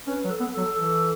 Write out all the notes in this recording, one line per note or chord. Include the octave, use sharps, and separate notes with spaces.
C#4 B4
F#3
A4
B3
A4
F#3
E3 A4